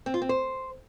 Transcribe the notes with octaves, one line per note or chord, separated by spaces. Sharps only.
C4
F4
C4
C5